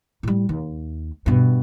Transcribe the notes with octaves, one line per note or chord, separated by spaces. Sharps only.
A2 G3
D#2
G2 B2